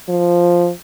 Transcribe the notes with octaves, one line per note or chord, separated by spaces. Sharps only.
F3